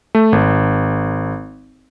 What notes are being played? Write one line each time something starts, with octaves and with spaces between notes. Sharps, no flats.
A3
G#1